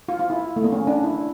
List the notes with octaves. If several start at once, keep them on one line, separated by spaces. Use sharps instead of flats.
F4
F4
E4
A3
A#3
C#4
D4
E4